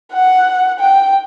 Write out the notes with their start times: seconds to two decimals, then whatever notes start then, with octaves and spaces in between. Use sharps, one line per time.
0.13 F#5
0.80 G5